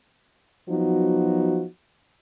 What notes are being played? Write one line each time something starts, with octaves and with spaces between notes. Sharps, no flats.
F3 F#3 B3 D#4 F#4